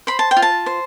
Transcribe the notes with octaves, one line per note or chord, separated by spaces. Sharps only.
C5 B5
A5
G5
F4
A5
C5